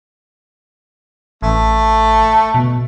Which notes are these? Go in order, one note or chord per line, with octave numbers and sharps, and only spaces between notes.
A1 A3
B2